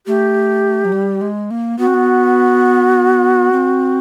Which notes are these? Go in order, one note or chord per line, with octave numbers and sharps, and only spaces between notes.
A3 G4
F#3
G3
G#3
A#3
B3 F#4
C4
B3
C4